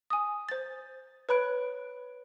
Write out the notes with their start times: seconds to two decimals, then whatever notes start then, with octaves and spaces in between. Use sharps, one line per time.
0.10 G#5 D#6
0.49 C5 A6
1.29 B4 C#5 B5 F#6 D7